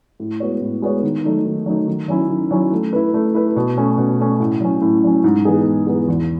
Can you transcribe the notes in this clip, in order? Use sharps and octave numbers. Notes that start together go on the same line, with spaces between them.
A2
G#3 B3 F#4 C#5
A2
G#3 B3 F#4 C#5
D#3
F#3 A3 D#4
D#3
F#3 A3 D#4
D#3
F#3 C#4 E4
D#3
F#3 C#4 E4
A3
E4 B4
A3
E4 B4
B2
A3 C#4
B2
A3 C#4
A2
F#3 C#4
A2
F#3 C#4
G#2
E3 B3 D#4 G#4
G#2
E3 B3 D#4 G#4
E2